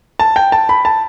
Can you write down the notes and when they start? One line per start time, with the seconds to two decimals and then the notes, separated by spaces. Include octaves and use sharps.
0.19 A5
0.36 G5
0.52 A5
0.69 B5
0.85 A5